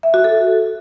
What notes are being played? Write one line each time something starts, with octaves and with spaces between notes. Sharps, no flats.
E5
F#4
A4